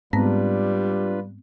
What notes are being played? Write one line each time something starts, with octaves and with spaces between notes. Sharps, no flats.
G#2 G3 B3 C4 D4 F4 B4